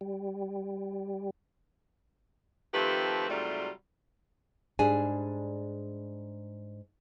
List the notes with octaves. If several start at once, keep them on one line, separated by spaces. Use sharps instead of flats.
G3
D#3 F3 A3 C4 G4 B4
G#2 C3 F#3 G3 A3 F4
G#2 G3 D4 G#4 G#5